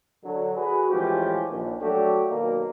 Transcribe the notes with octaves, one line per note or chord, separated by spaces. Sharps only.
D3 F#3
F#4 G#4 B4
A2 E3 F3 G#3 C#4 G4
A#1 D#2
F#3 A3 D4 F#4 G4 A4
B2 D#3 F#3 G3 A#3